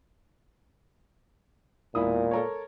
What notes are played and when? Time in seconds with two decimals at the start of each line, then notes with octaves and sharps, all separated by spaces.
1.95 E1 A#2 E4 D#6
2.31 A4 A#4 C#5